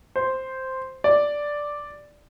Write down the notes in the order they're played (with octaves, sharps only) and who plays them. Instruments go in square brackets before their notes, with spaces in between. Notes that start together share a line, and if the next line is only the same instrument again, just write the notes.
[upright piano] C5
D5